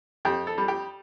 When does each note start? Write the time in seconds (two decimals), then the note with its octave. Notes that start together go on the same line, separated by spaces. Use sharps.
0.25 F2 G4
0.47 A4
0.58 G3
0.68 G4